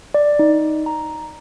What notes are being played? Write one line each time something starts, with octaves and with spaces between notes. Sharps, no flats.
D5
D#4
A#5